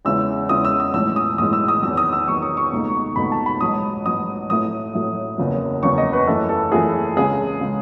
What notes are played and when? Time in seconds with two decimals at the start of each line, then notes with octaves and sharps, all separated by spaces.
0.05 E2 C#3 G#3 C#4 E4 E6
0.49 E2 C#3 G#3 C#4 E4 D#6
0.65 E6
0.80 D#6
0.94 B1 A2 E3 G#3 E6
1.16 D#6
1.38 B1 A2 E3 G#3 D#6
1.53 E6
1.68 D#6
1.82 E2 D#3 F#3 E6
1.97 D#6
2.13 E6
2.28 E2 D#3 F#3 C#6
2.42 D#6
2.57 C#6
2.72 C#2 B2 A3 D#4
3.16 C#2 B2 A3 D#4 B5
3.32 A5
3.46 B5
3.61 A1 G#2 F#3 D#6
4.05 A1 G#2 F#3 D#6
4.50 A2 F#3 A3 E4 D#6
4.95 A2 F#3 A3 E4
5.38 F#1 E2 C#3 F#3
5.83 F#1 E2 C#3 F#3 C#6
5.98 D#5
6.13 B4
6.27 F#2 E3 A3 E4 A4
6.49 A4
6.72 F#2 E3 A3 E4 G#4
7.16 C#2 C#3 G#3 G#4
7.61 C#3 G#3